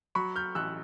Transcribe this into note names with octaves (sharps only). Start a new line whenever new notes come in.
F#3 B5 C#6
F6 G6
A1 E6 F#6